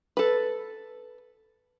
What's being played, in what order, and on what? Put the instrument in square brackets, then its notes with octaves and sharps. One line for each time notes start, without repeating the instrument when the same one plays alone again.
[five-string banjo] A4 B4